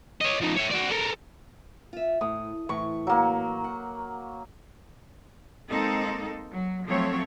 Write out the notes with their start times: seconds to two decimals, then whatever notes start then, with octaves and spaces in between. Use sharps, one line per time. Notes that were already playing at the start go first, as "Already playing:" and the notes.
0.21 C#5 D#5
0.41 F3 D#4
0.57 C#5 E5
0.72 F#4 D5
0.91 A4 A#4
1.93 F4 E5
2.21 A2 D#6
2.69 A2 E3 C#6
3.07 F#3 A#3
3.64 F#5
5.70 G#3 A#3 C4 D#4 A4
6.51 F#3
6.88 F3 F#3 A3 C4 A4 C#5